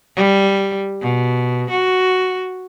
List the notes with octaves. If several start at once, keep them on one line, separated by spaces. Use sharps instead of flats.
G3
B2
F#4